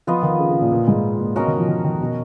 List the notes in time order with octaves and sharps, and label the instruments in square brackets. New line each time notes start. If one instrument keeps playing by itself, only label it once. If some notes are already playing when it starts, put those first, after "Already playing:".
[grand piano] F3 [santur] B3 F4 B4 D#5
[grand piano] D#3
C#3
C#3
A#2
A#2
G#2
A#2
[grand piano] B2 [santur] C#4 F#4 A#4 D#5
[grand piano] D#3
F3
D#3
D#3
B2